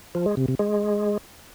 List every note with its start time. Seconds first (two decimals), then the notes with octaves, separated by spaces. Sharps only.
0.15 F3
0.26 G#3
0.37 C3
0.48 C3
0.59 G#3